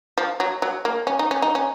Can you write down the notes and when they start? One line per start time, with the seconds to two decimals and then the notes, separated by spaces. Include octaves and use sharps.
0.18 F3
0.40 F#3
0.62 F#3
0.85 A#3
1.07 C#4
1.19 D#4
1.31 C#4
1.42 D#4
1.55 C#4